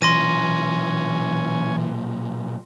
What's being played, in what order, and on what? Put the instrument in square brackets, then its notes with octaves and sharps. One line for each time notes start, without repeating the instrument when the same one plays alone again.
[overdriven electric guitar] B1 A#2 [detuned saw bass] E3 [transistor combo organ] C#4 G#5 [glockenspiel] C6 A#6 D#7